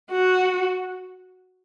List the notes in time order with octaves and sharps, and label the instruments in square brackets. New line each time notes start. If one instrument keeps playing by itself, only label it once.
[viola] F#4